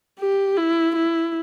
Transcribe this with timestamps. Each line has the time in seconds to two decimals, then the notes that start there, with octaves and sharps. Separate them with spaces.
0.20 G4
0.57 E4
0.96 E4